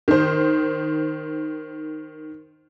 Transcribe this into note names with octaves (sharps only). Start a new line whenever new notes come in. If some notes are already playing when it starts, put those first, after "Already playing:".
D#3 C5